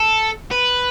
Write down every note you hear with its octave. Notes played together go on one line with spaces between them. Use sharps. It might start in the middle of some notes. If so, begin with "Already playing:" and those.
Already playing: A4
B4